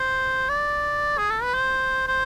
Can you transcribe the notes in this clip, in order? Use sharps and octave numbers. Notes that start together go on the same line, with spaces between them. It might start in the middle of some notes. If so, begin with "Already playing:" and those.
Already playing: C5
D5
G#4
A4
B4
C5
C5